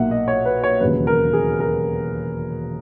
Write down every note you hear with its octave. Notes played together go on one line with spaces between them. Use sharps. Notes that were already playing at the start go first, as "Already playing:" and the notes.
Already playing: B1 A#2 A#3 E5 F#5
D#5
C#5
B4
C#5
E1 D#2 C#3 F#3 B4
A#4
G#4
A#4